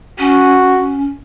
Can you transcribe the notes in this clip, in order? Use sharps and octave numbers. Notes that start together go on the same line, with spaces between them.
C#4 F#4